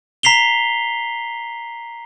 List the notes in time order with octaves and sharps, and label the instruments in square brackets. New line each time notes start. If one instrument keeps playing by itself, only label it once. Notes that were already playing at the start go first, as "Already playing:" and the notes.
[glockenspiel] A#5 B6 C7 F7 G7